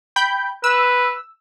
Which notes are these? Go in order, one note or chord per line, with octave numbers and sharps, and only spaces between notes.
G5 B5 G6
B4 E6